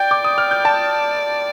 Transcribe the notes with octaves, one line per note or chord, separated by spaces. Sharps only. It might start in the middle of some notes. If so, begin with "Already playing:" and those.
Already playing: D5 G5 G6
D6
D#6
F6
G6
A5 A6